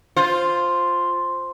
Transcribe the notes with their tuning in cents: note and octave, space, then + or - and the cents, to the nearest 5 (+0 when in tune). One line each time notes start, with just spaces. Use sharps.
F4 +0 C5 +0